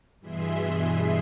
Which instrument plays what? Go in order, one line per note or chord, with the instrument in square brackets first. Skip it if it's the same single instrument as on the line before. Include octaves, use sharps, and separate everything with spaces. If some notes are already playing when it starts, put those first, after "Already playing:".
[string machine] G2 B2 E3 G#4 E5 C6